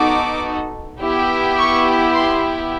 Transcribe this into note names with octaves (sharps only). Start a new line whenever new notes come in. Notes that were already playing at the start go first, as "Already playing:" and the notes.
Already playing: B3 D#4 F#4 A4 D6
B3 E4 G4
C#6
C6